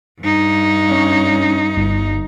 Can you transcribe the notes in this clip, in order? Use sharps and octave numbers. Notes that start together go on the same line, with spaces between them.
G2 D#4
C#4 D4
G1